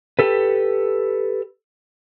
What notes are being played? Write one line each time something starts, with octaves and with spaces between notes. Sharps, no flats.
G4 A4 B4